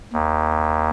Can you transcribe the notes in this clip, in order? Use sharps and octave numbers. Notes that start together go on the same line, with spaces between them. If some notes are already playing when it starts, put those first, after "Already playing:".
D#2